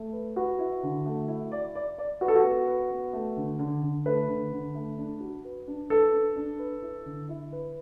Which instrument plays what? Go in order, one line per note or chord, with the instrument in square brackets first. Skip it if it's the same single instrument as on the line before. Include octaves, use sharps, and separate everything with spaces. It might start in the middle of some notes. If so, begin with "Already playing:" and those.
Already playing: [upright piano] A3
B4
[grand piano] F#4 [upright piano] B4
[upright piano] E4
D3
A3
E4
D5
D5
D5
[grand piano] F#4 [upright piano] B4
[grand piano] A4
F#4
[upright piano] B3
B4
B3
A3
D3
D3
D3
[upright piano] A3 [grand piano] B4
[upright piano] D3
D3
A3
D4
F#4
B4
D4
[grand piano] A4 [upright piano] B4
[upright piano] D4
D4
B4
E4
D3
E4
B4